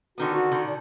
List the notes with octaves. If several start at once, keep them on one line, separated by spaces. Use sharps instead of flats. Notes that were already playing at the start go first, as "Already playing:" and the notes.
D3 D#3 B3 F#4
F#4
D3 D#3
A#2